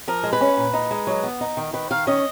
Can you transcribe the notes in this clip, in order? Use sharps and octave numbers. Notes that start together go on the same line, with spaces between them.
F3 A#4
G#3
B4
C#4
A#2
D#4
G#3
F#3
B3
D#4
D#3
D#3 B4
D#3 F5
C#4 D#5